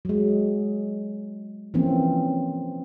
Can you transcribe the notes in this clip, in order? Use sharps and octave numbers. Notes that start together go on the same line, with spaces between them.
F#3 G#3
E3 F3 A#3 C4 C#4